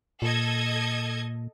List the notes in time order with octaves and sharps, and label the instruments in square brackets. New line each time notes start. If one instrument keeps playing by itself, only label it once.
[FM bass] A#2 [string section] A4 D#5 G#6